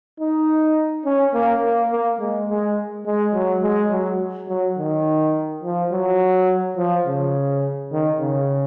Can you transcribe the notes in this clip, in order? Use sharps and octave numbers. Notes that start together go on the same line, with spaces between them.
D#4
C#4
A#3
A#3
A#3
G#3
G#3
G#3
F#3
G#3
F#3
F#3
D#3
F3
F#3
F3
C#3
D#3
C#3